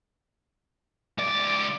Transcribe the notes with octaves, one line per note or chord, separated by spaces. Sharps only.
C#2 D5